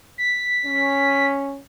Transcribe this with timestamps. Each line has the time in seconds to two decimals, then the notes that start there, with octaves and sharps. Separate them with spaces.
0.18 B6
0.66 C#4